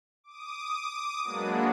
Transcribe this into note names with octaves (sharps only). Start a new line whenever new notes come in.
D6 D#6
F#3 G#3 A#3 B3 D4 F#4